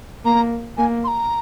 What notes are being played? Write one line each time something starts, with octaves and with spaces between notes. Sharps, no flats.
A#3 A#5
A#3 G#5
C6
A#5